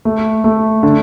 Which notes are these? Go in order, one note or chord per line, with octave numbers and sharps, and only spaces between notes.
A3
A3
D3